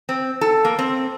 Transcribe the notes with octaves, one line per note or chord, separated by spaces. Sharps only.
C4
A4
A#3
C4